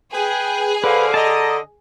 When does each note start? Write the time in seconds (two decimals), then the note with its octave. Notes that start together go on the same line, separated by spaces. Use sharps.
0.14 G#4 B4 G5
0.84 D3 B4 C5 F5
1.14 D#5 A5 A#5